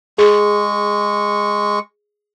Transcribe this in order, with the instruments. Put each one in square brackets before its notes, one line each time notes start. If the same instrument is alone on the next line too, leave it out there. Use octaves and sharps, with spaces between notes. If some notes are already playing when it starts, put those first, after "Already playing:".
[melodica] G#3 C#6 [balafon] G#4